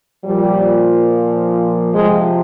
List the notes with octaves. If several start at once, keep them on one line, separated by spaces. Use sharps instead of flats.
A#2 F3 G3
C3 F3 G#3